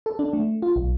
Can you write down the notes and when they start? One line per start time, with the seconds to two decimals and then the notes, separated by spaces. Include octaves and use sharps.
0.06 A4
0.19 D4
0.33 A3
0.62 F4
0.76 B1